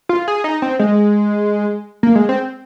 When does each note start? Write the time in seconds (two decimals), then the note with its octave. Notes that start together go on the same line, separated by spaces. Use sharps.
0.09 F4
0.28 G#4
0.44 D#4
0.62 C4
0.79 G#3
2.03 A#3
2.15 G#3
2.29 C4